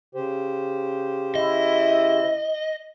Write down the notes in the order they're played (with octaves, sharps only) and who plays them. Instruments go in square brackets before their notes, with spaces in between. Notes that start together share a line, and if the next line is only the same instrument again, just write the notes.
[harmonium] C#3 G4 C5
[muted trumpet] E4 [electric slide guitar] D#5